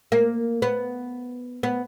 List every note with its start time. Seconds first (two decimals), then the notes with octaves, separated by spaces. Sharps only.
0.12 A#3
0.62 B3
1.63 B3